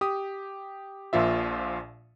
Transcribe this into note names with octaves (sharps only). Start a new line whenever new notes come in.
G4 D#6
A#1 A#2 F3 F4 E5